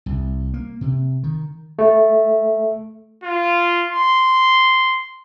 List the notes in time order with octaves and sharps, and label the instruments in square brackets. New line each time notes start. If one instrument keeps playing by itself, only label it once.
[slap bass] C2
A#3
C3
D#3
[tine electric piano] A3
[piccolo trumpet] F4
C6